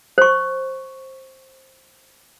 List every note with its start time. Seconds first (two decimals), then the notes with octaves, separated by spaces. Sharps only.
0.18 C5 C#6